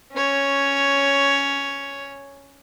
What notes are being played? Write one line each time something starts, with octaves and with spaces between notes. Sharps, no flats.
C#4 C#5